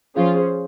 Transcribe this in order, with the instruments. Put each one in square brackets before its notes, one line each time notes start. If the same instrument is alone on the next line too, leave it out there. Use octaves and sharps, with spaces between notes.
[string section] F3 F4 [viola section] C#4 G#4 C5